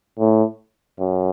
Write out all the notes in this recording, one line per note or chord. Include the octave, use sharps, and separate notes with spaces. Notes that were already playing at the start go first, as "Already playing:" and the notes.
A2
F#2